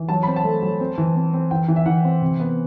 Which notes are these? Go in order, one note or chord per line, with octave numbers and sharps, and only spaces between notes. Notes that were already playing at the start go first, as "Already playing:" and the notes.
Already playing: E3
F#3 A5
C4 B5
A5
A3
F#3
C4
E3
C4
C4
E3 G5
E3
E5
E3 F#5
C4
C3
B3